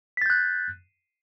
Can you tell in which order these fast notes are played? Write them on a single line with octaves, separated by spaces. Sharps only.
B6 A6 G6 F#6